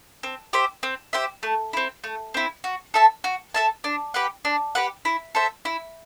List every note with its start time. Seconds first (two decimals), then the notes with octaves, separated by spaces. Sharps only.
0.23 C4
0.53 G4 C5 E5
0.83 C4
1.13 G4 C5 E5
1.43 A3
1.73 C4 E4
2.04 A3
2.34 C4 E4
2.64 F#4
2.94 A4 E5 A5
3.24 F#4
3.54 A4 E5 A5
3.84 D4
4.14 G4 B4 F#5
4.45 D4
4.75 G4 B4 F#5
5.05 E4
5.35 A4 C5 E5
5.65 E4